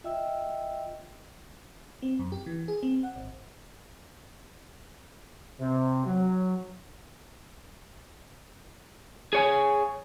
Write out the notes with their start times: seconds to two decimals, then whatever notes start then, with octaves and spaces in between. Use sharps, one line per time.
0.04 F4 D#5 E5 G5 E6
2.02 C4
2.19 F#2
2.32 G4
2.46 E3
2.68 G#4
2.83 C4
3.03 F#5
3.16 G#1
5.59 C3
6.05 F#3
9.33 G#4 C#5 G#5